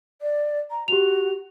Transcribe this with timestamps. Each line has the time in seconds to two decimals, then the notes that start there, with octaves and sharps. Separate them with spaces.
0.21 D5
0.71 A#5
0.88 F#4 G4 F7